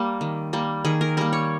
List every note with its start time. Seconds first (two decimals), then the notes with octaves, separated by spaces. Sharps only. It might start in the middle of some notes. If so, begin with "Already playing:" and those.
Already playing: G3 A#3
0.21 D#3
0.53 G3 A#3
0.85 D#3 G#4
1.01 A#4
1.17 G3 A#3 A#4
1.33 C#5